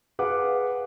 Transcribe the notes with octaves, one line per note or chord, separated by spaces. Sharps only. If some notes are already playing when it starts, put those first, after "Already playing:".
G#4 B4 F5 F#5 D6